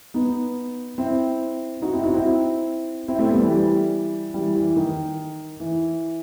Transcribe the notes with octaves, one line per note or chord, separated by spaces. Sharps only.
B3 D#4
C4 E4
D#4 F#4
C4 E4
D#4 F#4
C4 E4
C4 E4
A3 C4
G3 B3
E3 G3
E3 G3
E3 G3
E3
D#3
E3